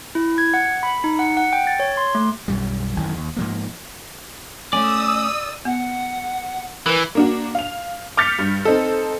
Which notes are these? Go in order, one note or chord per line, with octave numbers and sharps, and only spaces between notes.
E4
G#6
F#5
B5
D#4
F#5
F#5
G5
A6
C#5
C6
A3
B1 F#2 G3
G#1 F#2 D#3 E3
D#2
G#2 F3 A#3
A3 C#4 D5 G#5 D#6 E6
B3 F#5
E3 A#4 B4 E6
A#3 D4 F#4
F5 F7
D6 F6 G6 A6 B6 C#7
G2
C4 D#4 A4